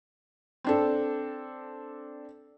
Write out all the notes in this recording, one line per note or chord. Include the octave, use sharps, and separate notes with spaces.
C4 D4 A4